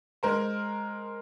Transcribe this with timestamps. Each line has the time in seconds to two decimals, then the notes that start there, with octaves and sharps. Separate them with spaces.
0.23 G#3 A#4 C5